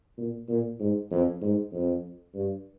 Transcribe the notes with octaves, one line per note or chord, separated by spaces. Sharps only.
A#2
A#2
G#2
F2
G#2
F2
G2